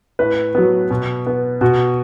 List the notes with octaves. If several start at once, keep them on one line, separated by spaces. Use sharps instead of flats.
A2 B4
F#3 B3
B2
B3
B2 F#4